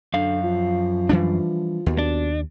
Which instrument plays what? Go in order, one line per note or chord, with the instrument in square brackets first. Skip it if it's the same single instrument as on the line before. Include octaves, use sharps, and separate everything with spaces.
[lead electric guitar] F#2 F5 [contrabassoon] D3
[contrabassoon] F3
[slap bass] E3 G3 D4
[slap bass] D#2 [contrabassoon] B2
[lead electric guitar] D4